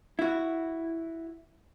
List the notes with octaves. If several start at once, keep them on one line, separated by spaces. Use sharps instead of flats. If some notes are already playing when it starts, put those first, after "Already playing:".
E4 F#4